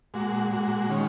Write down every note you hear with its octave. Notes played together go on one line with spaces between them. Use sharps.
A#2 G#3 F#4
A#2 G#3 F#4
D#3 G#3 C#4